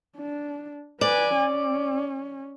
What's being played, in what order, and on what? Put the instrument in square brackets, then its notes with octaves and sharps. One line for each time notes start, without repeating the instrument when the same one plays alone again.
[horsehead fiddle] D4
[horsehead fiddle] B4 G#5 [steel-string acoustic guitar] D5
[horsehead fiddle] C#4